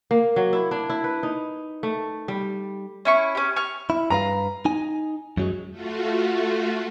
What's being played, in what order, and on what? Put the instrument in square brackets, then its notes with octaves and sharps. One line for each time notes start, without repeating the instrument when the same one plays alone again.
[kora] A#3
F#3
E4
D4
E4
B4
D#4
A3
G3
[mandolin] C#4 E4 C#6
C#4 G4
C#6 F6
[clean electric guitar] E4
[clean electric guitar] G2 B4 F5 [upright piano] A#5
[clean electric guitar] D#4 G#5
F#2 F#3 G#3
[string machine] A3 F4 F#4